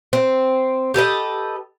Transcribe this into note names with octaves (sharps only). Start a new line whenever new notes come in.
C4
G4 A4 B4 D#5